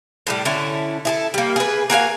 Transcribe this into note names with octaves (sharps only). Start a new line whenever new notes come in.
A2 F#3 G3
D3 C#4 E4 A4
E4 G#4 A4
G3 A#3
G#4 B4
A#3 F#4 G#4 F5